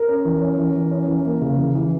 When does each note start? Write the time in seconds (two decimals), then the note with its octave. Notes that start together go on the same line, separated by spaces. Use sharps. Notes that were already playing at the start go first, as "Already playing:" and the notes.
Already playing: A#4
0.08 C#4
0.25 E3
0.42 C#4
0.59 E3
0.75 E3
0.91 C#4
1.08 E3
1.25 A#3
1.41 C#3
1.58 E3
1.75 E3